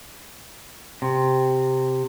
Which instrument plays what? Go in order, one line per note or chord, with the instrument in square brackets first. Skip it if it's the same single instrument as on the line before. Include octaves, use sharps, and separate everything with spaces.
[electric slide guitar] C3